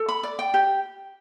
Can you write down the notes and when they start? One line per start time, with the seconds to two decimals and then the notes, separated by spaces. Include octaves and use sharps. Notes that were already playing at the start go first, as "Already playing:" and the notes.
Already playing: A4
0.09 B5
0.23 D5
0.39 G5
0.54 G4